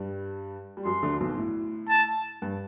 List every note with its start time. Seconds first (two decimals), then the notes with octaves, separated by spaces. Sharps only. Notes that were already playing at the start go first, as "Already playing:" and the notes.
Already playing: G2 G3
0.77 G3
0.85 F#2 F#3 C6
1.03 D2 D3
1.20 B1 B2
1.37 A2
1.89 A5
2.42 G2